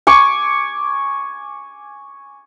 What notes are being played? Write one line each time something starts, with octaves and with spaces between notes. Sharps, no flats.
G#5 C#6 D6